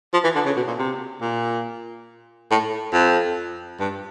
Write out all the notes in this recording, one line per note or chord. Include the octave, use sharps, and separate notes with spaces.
F3
E3
D3
C#3
B2
A#2
C3
A#2
A2
F2
G2